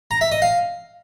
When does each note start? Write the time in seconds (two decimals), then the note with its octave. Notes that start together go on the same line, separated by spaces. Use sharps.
0.11 A#5
0.21 E5
0.32 D#5
0.42 F5